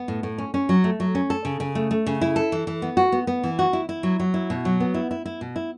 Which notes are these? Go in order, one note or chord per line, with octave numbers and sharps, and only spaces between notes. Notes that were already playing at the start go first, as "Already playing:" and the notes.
Already playing: B3
A2
A2
C#4
C#4
F#3
A3
F#3
C#4
A4
C#3
C#3
A3
A3
C#3
E4
A4
E3
E3
B3
F#4
B3
B3
E3
F#4
E4
E4
F#3
F#3
E4
B2
F#3
B3
E4
E4
E4
B2
E4